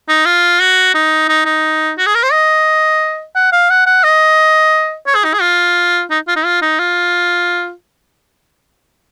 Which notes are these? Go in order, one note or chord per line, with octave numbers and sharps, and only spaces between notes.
D#4
F4
F#4
D#4
D#4
D#4
F#4
G#4
A#4
C5
D#5
F#5
F5
F#5
F#5
D#5
C#5
G#4
D#4
G#4
F4
D#4
F4
D#4
F4
D#4
F4